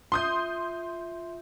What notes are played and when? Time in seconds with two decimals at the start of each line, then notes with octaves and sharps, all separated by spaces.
0.12 F4 E5 C6 D#6 G6